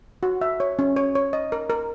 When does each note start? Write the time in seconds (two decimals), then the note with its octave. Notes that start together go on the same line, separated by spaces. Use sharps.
0.23 F#4
0.41 E5
0.60 C#5
0.79 C#4
0.96 C#5
1.15 C#5
1.33 D#5
1.52 A#4
1.70 A#4